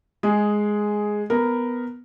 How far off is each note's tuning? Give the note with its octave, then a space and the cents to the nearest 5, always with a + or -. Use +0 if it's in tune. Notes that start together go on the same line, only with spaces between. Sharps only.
G#3 +0 G#4 +0
B3 +5 A#4 +0